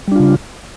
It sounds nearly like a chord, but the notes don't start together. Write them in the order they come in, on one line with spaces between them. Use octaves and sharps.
G3 D4 F4 C#3